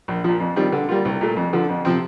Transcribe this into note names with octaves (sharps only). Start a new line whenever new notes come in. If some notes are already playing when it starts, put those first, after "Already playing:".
A#1
A#2 F3
F2
D#3 G3 C4 F4
D3
G3 A#3 F4
C2
A#2 A3
F2
D3 F3
F2
C3 F3 C4